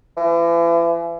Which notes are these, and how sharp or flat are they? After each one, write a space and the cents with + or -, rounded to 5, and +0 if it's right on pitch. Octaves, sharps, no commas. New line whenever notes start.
E3 +40